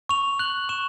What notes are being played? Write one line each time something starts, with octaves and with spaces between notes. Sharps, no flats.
C#6 F7
F#6 F#7
C#6 E7